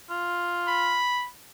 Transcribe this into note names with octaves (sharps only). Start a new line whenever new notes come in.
F4
B5